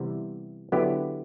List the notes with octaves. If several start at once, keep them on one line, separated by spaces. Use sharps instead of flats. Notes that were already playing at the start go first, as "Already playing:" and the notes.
Already playing: C3 E3 G3 B3
D3 F#3 B3 E4 G4